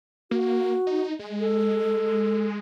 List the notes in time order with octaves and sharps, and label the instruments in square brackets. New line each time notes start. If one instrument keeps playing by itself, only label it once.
[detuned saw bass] A#3 [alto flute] F#4
[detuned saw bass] D#4
G#3
[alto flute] A4